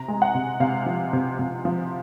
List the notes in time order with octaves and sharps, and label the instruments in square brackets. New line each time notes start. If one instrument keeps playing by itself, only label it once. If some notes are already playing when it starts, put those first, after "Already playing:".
Already playing: [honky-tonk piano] C3 A#5
G#3
F#5
C3
C3 F5
F3
C3
C3
F3